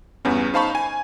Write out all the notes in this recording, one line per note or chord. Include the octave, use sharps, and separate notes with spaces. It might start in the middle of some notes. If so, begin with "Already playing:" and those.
E2 G2 B3 C#4
D#4 C5 F5 A5 B5 C#6
G#5